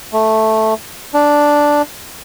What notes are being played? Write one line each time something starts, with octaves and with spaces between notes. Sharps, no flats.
A3
D4